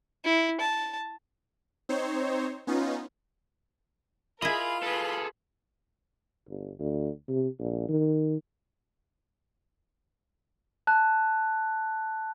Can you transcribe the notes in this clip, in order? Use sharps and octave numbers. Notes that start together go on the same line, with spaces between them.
E4
A5
C4 D#4 C5 C#5
B3 C#4 D#4 F4
E4 F4 G#4 A#4 D#5 B5
G#4 A4 B4 B5 C6
G1
D2
C3
A#1
D#3
A5 F#6